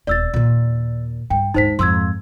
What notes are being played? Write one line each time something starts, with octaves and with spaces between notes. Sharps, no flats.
D#1 B3 D5 E6 A6
D#2 A#2
G2 G5
D#2 G#2 D#4 C5 B6
F2 G#2 C6 E6 G#6